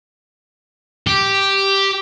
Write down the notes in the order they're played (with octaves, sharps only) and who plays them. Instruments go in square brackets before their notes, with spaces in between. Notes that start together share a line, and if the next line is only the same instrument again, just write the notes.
[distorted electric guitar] G4